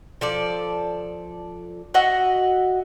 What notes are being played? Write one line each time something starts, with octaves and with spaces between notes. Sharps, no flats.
F3 A4 D5
F#4 D#5 E5 F#5